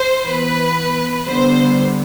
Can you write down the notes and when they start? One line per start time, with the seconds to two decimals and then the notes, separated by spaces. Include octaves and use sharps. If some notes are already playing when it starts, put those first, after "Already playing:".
Already playing: C5
0.25 E3 B3 B4
1.27 D3 G3 B3 C5